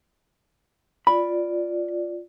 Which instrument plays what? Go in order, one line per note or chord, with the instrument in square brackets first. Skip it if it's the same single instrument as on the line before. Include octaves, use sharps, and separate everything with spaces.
[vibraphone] F4 D5 [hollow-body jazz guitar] B5